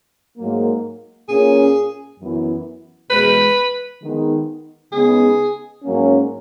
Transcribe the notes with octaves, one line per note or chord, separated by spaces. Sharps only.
G#2 F#3 A#3
A#2 A#3 C#4 G#4
F#2 E3 B3 E4
E2 B2 G#3 B4
D#3 G#3 B3 D#4
C#3 G#3 B3 D#4 G#4
G#2 F#3 A#3 C#4